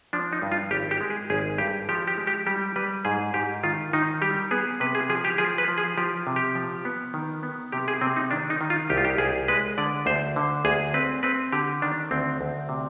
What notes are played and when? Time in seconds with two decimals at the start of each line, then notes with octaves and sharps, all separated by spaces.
0.13 F3 D4
0.33 D#4
0.42 G2
0.52 F4
0.71 G#1 G4
0.91 G4
1.01 G#3
1.10 G#4
1.30 G#1 G#4
1.58 G2 G4
1.89 F3 G4
2.07 G4
2.18 G#3
2.27 G4
2.47 G3 G4
2.76 G3 B4
3.05 G#2 G#4
3.34 G#2 G4
3.64 D#3 F4
3.93 D#3 D#4
4.22 G3 G4
4.51 B3 G#4
4.80 C3 B4
4.95 G#4
5.09 F3 G#4
5.25 G4
5.38 F3 G#4
5.58 B4
5.68 F3
5.78 G#4
5.98 F3 G4
6.27 C3
6.36 G4
6.55 F3
6.85 B3
7.14 D#3
7.43 B3
7.72 C3 G4
7.88 G#4
8.01 C3 C4
8.16 D#4
8.31 D#3 D4
8.50 D#4
8.61 D#3
8.70 F4
8.90 C2 G4
8.97 F4
9.05 G4
9.18 C2 G#4
9.48 G#3 B4
9.78 D3 D5
10.06 D2 C5
10.36 D3
10.65 D2 G#4
10.94 C4 B4
11.23 C4 B4
11.52 D3 G4
11.82 D#3 D4
12.11 D2 C4
12.41 D2
12.69 C3